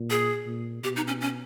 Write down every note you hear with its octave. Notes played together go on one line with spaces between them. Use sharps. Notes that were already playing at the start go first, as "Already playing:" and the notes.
Already playing: A#2
G#4
A#2
B2 G4
D#4
C#4
C#4